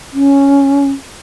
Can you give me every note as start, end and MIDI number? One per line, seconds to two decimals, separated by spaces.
0.13 0.89 61